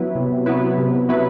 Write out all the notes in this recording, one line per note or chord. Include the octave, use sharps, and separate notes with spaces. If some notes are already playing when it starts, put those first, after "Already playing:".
Already playing: F#3 B3 E4 B4
C3
F#3 B3 E4 B4
C3
F#3 B3 E4 B4